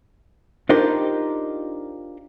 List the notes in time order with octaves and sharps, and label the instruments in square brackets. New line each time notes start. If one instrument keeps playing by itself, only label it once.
[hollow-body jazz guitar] D4 D#4 F4 G4 A#4 C5